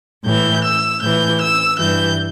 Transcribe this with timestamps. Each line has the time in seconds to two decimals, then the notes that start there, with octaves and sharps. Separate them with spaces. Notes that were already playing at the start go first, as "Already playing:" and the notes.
0.25 A2 E3 G6
0.63 E6
1.02 A2 E3 G6
1.40 E6
1.78 G2 E3 G6